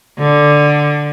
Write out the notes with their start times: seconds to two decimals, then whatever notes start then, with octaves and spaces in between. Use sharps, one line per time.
0.19 D3